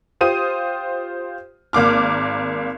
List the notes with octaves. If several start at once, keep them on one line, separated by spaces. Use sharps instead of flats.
F4 G4 C5 D#6 D#7
G#1 A#3 D6 F6